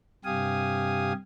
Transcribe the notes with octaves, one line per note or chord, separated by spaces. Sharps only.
G2 C3 G4 F5 G#5 D#6